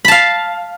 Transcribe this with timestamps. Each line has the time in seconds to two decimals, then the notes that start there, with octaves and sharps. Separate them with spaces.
0.05 B5
0.08 A5
0.11 F5